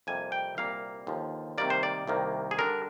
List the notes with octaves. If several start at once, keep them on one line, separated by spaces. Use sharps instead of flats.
F2 C3 G3 A#3 G#5
G5
C2 A#2 G3 A#3 F5
D#2 D3 F3
C3 D#3 G3 A#3 D5
C5
D5
C2 C3 D#3 A#3
G#4
D3 G3 D4 A#4